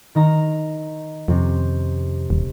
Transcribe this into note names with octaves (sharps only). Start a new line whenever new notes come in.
D#3 D#4 A#5
F2 C3 C4 C#4
D#1